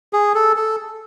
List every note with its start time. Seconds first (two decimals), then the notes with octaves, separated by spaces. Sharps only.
0.13 G#4
0.35 A4
0.56 A4